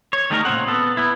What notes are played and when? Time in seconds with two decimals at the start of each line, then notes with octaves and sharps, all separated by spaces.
0.13 C#5
0.30 D#3 G3 A3 D#4 E4 A#4
0.45 A#2 C#3 C4 F#5
0.68 B3 A4
0.97 B3 E4